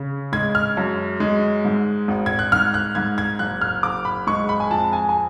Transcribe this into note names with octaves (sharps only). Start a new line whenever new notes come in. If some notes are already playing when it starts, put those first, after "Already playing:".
Already playing: C#3
G#3 G#6
F6
F#2
G#3
G#2
G#1
G#6
F#6
G#2 F6
F#6
G#2 G#6
G#6
F#1 F#6
F6
F#1 D6
B5
G#3 C#6
B5
G#5
F2 A5
G#5
G#5